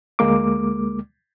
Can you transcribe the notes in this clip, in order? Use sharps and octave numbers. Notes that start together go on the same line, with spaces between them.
D2 G#3 A#3 D6